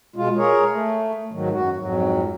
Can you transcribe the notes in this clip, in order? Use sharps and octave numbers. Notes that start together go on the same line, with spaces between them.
B2 G#3 F4
G#4 A#4 C#5
A3
G#2 D#3 F#3
F#2 F#4
F2 G#2 F#3